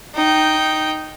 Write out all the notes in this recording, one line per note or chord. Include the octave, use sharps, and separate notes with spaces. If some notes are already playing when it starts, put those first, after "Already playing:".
D#4 G5